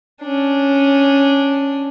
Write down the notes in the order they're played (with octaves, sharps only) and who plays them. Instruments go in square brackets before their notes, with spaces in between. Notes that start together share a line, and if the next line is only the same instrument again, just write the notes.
[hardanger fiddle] C#4 D4